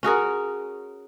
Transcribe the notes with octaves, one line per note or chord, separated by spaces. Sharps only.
C#4 F#4 G#4 A#4